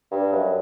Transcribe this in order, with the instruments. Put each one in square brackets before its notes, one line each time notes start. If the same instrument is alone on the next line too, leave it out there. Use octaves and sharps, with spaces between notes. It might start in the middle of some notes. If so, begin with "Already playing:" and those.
[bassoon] G2
F#2